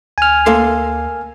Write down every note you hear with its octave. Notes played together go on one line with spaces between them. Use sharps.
D2 G#5 F6
A#3 A4 C6